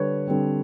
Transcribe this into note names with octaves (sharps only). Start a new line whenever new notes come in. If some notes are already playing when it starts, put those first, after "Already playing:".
Already playing: D3 G3 B4 C#5
D3 G3 C4